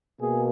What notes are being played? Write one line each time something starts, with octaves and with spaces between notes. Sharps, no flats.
B2 A#3 G#4